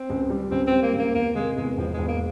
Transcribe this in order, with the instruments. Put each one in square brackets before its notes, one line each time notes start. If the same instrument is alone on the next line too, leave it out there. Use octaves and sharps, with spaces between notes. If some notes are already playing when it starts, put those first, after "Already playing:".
Already playing: [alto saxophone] C4
[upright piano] C#2
G3
[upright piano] C#2 [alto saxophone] C4
[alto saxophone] C4
[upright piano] G3
[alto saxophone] A#3
[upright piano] C#2
[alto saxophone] A#3
[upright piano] E2 [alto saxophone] A#3
[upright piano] C3 [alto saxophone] G#3
[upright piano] E2 [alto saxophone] G#3
[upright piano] E1 [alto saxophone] F3
[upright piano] E1 [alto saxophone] G#3
[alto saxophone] A#3